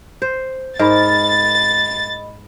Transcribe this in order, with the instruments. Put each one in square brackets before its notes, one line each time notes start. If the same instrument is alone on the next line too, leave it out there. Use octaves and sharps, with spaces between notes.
[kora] C5
[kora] G#2 A#4 [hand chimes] D#5 B5 [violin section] A6